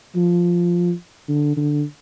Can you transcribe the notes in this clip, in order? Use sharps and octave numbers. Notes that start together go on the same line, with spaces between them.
F3
D3
D3